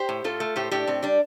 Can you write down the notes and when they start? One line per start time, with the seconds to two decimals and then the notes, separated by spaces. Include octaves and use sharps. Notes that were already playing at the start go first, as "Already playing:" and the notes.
Already playing: G4 C5
0.09 A2
0.24 A2 F4 A4
0.40 A3
0.56 A2 G4 C5
0.71 A2 D4 G4
0.87 A2 C4
1.03 G3 D4